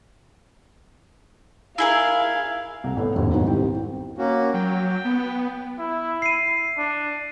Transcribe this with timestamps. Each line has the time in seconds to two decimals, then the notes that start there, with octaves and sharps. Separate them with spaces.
1.78 E4 G#4 A#4 F5
2.84 C2
2.97 A2 B3
3.15 F1 A#1 D#2
3.33 B1 G#2
3.47 C2 G5
4.18 A#3 C#4 F#4
4.54 F#3 G5
5.05 B3
5.79 E4
6.22 C7 D#7
6.78 D4